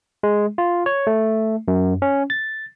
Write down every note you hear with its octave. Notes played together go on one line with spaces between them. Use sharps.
G#3
F4
C#5
A3
F#2
C#4
A6